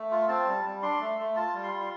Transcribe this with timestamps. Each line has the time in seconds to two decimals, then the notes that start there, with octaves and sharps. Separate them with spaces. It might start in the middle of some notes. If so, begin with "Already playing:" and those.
Already playing: A3
0.11 F4
0.28 C4 A5
0.47 G3
0.64 G3
0.82 D4 C6
1.00 A3
1.18 A3
1.36 F4 A5
1.54 G3
1.63 C6
1.72 F4
1.80 C6